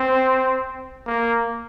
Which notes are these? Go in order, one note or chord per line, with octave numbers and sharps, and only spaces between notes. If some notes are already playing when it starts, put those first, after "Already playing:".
Already playing: C4
A#3